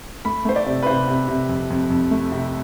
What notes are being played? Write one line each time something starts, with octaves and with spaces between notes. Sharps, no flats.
A3 B5
A3 C5
D5
C3
B4
C3 C5
C3
C3
F2
F2
F2
A3
C3